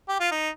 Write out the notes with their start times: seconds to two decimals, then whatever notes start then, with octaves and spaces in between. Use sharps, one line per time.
0.08 G4
0.20 F4
0.31 D#4